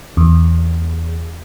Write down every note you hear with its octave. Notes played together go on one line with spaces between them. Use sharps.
E2